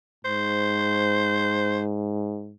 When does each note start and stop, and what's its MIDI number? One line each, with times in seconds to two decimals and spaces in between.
0.25 2.56 44
0.25 1.82 72